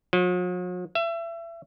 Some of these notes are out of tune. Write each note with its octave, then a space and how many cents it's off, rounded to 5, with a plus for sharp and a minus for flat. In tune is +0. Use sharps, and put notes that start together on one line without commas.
F#3 -45
E5 +30